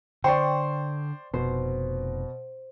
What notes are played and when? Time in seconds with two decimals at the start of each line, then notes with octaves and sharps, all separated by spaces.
0.24 D3 C5 D5 G5 C6 C#6
1.34 F1 B2 C5